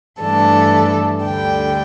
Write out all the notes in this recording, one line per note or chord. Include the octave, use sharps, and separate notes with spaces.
G2 E3 A3 D4 A4
D2 D3 G3 G5